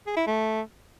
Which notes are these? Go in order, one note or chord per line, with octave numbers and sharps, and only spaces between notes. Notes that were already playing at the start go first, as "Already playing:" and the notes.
G#4
E4
A3